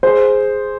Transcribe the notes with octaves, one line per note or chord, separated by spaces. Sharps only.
G#4 C5